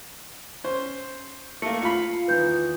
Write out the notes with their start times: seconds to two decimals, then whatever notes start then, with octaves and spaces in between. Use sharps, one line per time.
0.64 C#4 C5
1.62 A3 A#3 C#7
1.82 F4 F5 B5
2.28 E2 D#3 D#4 B4 G6